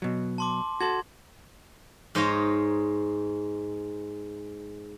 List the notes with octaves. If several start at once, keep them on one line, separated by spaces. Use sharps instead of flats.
B2 F#3
A5 C6 D6
F#4 A4 C6 G#6
G#2 C5 C#5 D#5 F5 A#5